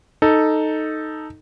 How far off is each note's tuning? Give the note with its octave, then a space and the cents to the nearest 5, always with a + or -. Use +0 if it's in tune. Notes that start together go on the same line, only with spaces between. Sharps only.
D#4 +0 A4 +0